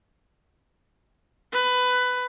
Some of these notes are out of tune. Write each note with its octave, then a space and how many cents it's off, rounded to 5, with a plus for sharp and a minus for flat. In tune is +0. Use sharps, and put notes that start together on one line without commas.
B4 +15